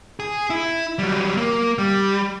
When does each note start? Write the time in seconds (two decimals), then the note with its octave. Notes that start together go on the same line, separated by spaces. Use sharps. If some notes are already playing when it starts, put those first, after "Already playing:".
0.20 G#4
0.50 E4
0.99 F#3 G3
1.37 A#3
1.78 G3